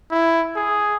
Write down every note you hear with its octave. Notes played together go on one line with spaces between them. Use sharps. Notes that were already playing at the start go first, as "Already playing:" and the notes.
E4
G#4